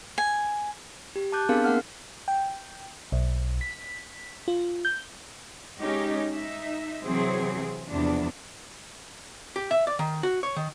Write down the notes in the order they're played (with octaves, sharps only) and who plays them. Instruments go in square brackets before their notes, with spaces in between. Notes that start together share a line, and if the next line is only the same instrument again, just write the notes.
[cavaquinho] G#5
[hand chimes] G4
A5 D6 F#6 G6
B3 C4 D4 G#4 A#4 F5
A#3 A#4 F#5 F6
[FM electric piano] G5
B1
B6
F4
G6
[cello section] G#3 C#4 D#4 G4
D#4 E5
C3 E3 F#3 C4 G#4
E2 C3 F3 B3 D4
[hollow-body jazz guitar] G4
E5
D5
D#3
F#4
C#5
D#3